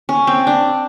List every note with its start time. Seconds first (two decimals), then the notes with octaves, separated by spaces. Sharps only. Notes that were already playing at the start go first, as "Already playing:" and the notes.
0.09 C#4
0.27 C4
0.47 D4